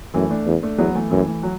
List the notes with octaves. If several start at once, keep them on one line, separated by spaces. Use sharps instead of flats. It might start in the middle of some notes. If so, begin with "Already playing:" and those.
F#2 E3 A3
A3 D4
E2
A3 D4
E2 F#3 B3
E3 A3
F#2 E3 A3
E3 A3
F#3